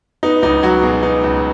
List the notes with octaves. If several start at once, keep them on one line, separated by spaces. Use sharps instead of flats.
B3 D#4
C#2 D#4
F#3 F#4
B2 G#4
B3 D#4
C#2